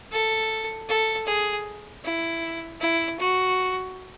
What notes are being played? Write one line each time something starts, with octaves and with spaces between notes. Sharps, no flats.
A4
A4
G#4
E4
E4
F#4